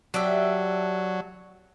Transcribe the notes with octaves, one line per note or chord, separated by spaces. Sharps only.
F#3 D4 G4 E5